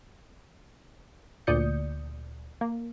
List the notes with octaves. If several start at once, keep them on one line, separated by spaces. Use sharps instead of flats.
D2 A#2 D5 D#6 G6 C#7
A#3